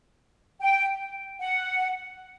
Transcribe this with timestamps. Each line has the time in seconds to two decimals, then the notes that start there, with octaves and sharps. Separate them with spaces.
0.60 G5
1.40 F#5